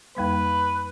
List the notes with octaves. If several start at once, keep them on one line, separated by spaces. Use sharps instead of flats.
F2 G3 A#3 B4